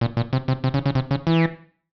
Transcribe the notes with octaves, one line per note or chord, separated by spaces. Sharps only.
A#2
A#2
C3
C3
C3
C#3
C#3
C3
C#3
E3